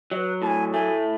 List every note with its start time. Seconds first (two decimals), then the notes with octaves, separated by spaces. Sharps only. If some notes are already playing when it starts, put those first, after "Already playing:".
0.11 F#3 D#5
0.16 B4
0.42 A2 A5
0.47 G#5
0.73 A3 G#5